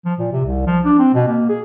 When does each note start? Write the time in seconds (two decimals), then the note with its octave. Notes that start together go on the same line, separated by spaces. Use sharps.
0.05 F3
0.19 A#2
0.32 C3
0.45 C2
0.67 F3
0.85 D4
0.99 C4
1.14 B2
1.28 A#3
1.49 G#4